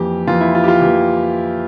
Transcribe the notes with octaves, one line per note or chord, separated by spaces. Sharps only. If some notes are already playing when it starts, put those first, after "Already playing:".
Already playing: F2 E3 A#3 G4
F2 E3 A#3 F4
E4
F4
G4
F4
F2 E3 A#3 G4